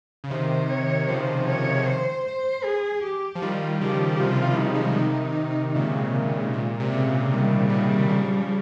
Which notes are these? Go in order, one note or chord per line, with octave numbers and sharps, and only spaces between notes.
C#3
C3 D#3 C5
C#5
C#3 F3 C5
C#5
C5
C5
G#4
G4
F3
D#3 G3 F4
C#3 F3 G4
C#3
C3 D#3 F4
C3 D#3 D#4
G#3
G3
F3
C3 D#3 D#4
A#2 C#3 G#3
A#2
C3
A#2 C#3
C3 D#3 G3
C3 D#3
C#3 F3